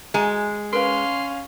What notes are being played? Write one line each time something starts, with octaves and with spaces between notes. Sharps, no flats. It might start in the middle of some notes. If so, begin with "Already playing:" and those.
G#3 F#4 G#5 A#5
C#4 A#4 B4 F5 C6